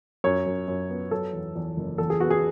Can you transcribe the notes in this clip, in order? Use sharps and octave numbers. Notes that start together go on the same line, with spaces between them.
F#2 C#5
F#2
F#2
B3
F#3 A4
E2
E2
F#1
E2 A4
G#4
B3 F#4
G#4